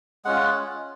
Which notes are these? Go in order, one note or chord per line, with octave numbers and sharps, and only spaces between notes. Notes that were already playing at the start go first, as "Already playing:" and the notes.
G#3 C#4 F4 F#5